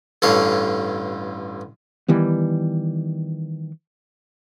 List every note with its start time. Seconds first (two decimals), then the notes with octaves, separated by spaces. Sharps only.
0.22 A1 G2 D3 C#5 F5
2.08 D#3 E3 G3 B3